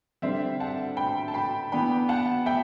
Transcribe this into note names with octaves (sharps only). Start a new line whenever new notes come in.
D3 G3 C4 C5 E5
F#5 A5
G5 B5
A5
G5 B5
E3 B3 D4 G5 B5
F#5 A5
E5 G5